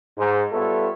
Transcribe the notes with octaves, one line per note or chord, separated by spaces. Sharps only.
G#2
G3 B3 F4 A4 C#5 E5